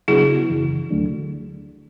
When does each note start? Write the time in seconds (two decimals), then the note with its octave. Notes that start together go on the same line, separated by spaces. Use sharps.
0.08 C#3 F#3 B3 D4 E4 F#4 G#4
0.49 F#2 C#3 E3
0.91 D2 D3 F#3 A3 D4